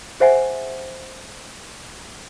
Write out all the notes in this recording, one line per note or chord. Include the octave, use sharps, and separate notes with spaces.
G#4 C5 E5 F#5 G#5